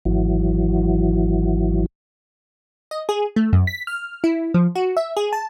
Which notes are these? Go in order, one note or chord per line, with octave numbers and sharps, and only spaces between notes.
G#1 E3 F#3
D#5
G#4
A3
F#2
B6
F6
E4
F3
F#4
E5
G#4
A5